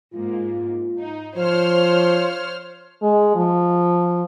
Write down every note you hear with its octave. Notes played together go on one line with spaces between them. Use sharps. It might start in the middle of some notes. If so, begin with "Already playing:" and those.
G#2 A#3 F4
D#4
F3 C5 C#5 F6
G#3
F3